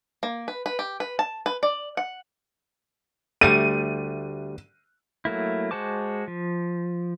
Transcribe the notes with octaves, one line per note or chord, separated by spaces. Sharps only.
A#3
B4
B4
G4
B4
A5
B4
D5
F#5
D2 G3 A3 D#7
F#3 A3 A#3 E4
G#3 F#4 C5 A5 D6
F3